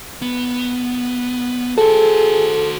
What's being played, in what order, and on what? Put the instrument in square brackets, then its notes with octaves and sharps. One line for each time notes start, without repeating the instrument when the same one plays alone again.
[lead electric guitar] B3
[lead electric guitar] F#4 C5 [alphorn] G#4 [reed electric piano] A4